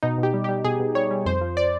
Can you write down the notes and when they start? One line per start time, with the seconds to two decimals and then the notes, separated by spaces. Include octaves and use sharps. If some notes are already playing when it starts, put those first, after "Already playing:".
0.03 B2 D#4
0.18 B2
0.23 G4
0.34 G3
0.44 G3 G4
0.64 B2 G#4
0.80 B2
0.95 G3 C#5
1.11 G3
1.26 F2 C5
1.41 F3
1.57 D5